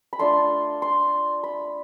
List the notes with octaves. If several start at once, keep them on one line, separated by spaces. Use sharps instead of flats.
B5
A3 D4 F4 C6
C6
B5